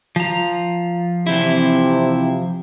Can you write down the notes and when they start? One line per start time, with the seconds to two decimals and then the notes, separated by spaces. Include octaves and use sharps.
0.16 F3 A#5
1.27 C3 E3 C4 E4